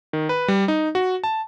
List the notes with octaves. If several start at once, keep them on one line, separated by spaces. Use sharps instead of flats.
D#3
B4
G3
D#4
F#4
A5